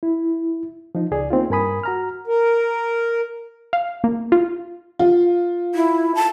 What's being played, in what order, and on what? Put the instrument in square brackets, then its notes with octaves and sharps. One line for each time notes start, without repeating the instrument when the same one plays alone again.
[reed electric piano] E4
F3 D#4
C#2 G#4 D5
A#3 C4 D#4 F4
G2 A#4 G#5 B5 D#6
F#4 A#5 F6
[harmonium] A#4
[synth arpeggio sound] F5
A#3
F4
[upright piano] F4
[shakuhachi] E4
A5